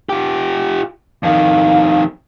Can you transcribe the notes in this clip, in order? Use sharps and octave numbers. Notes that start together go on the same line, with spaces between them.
F4 G4
F2 D#3 F5